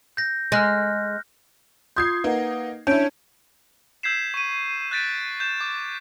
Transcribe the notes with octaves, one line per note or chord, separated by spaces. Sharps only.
G6 A#6
G#3 F6 F#6 A#6
F4 C6 D#6 G6 G#6 C7
A#3 D#4 B4 F#5
C#4 D4 E4 C#5 G6 D7
E6 G6 G#6 B6 C7 E7
C#6 D#7
F#6 G6 A6 B6 D7
G6 E7
D6